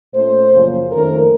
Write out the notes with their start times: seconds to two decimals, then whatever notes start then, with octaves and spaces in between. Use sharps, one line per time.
0.13 A#2 A3 C#4 C5
0.52 F#2 C#3 F3 A#3 C#4
0.91 F2 D#3 A3 C#4 A#4